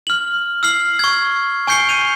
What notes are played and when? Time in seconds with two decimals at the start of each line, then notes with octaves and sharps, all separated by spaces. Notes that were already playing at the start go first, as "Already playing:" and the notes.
0.07 F6 F#7
0.63 E6 F6 C7 F#7
0.99 C#6 G#6
1.67 G#5 C#6 G6 C7 C#7 G7
1.89 G6 D#7 F7